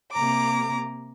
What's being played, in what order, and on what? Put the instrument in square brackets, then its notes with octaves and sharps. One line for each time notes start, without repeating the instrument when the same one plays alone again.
[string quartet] C3 A#3 A#5 D6